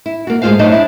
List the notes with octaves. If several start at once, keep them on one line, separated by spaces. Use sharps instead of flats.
E4
A#3 F#4
A2 G#3 A3 F4 C5 F5
F#3 A3 D4 D#4 C5 D#5
D4 E4